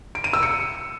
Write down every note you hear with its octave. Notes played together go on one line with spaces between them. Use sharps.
D7
D#7
E6
C#7